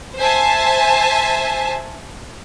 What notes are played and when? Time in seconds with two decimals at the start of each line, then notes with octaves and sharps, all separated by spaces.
0.18 C5 E5 G#5 A5